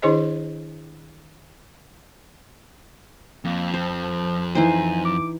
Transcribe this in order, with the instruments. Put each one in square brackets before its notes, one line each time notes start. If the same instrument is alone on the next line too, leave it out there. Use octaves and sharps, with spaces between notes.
[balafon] D#3 D4 E4 G#4 C5 D#5
[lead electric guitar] F2 [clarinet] A#3
[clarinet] F3 [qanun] C5
[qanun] E3 D#4 C5 [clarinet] G#5
[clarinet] D6